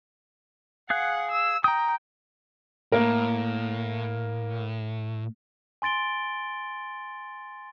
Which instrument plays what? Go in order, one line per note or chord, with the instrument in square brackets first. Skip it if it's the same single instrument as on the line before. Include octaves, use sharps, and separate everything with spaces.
[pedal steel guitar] G#4 F5 F#6 [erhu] F#5
[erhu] E6
[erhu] G5 [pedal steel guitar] A#5 D#6
[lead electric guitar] A2 [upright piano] A#3 A#4
[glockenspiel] G#5 C6 A6 D7 G7